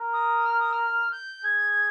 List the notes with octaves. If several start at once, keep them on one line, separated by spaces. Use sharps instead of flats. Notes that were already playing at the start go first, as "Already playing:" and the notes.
Already playing: A#4
D#6
F6
D#6
F6
G6
G#4 G#6